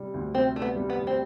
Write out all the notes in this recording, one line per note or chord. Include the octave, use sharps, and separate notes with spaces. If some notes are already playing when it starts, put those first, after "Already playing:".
Already playing: C3 G3 D4
D2
C3 C4
A3 D4
B3
G3
B3
D2
C4